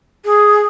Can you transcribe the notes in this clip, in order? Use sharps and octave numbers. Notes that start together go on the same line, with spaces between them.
G#4